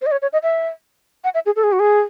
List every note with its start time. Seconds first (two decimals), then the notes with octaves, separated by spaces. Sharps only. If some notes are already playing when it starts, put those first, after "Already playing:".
0.02 C5
0.06 D#5
0.12 C#5
0.22 C#5
0.33 D#5
0.43 E5
1.24 F#5
1.34 E5
1.46 G#4
1.56 A4
1.64 G#4
1.72 F#4
1.80 G#4